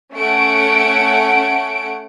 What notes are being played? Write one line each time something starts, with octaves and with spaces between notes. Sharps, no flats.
A3 C#4 F#5 D7